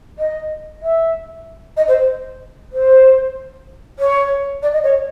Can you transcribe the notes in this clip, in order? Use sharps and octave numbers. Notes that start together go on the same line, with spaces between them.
D#5
E5
D#5
C5
C5
C#5
D5
D#5
C#5